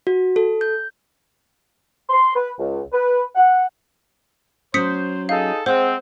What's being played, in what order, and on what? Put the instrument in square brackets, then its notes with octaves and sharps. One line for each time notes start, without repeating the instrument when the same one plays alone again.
[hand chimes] F#4
A4
G6
[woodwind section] C6
B4
C#2
B4
F#5
[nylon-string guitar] F#3 C#4 [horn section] C5 [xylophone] D#6 B6 C#7
[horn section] D#4 G#4 A4 [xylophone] F5
[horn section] G#3 C4 [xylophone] C5 [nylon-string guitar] F#5